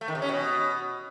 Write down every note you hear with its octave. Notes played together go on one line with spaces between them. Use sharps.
A3
D#3
C3
C#4
B2